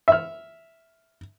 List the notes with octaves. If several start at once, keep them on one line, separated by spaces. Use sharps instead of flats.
E5 F6